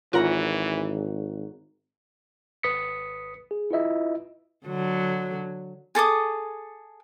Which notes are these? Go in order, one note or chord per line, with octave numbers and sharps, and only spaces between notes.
G#1 E3 F4 A#4 C#5 F#5 A#5
G#1 B4 D#6 B6 C#7
G#4
E4 F4 B4 D#5 E5
D3 F#3
G#4 A4 D6 D#6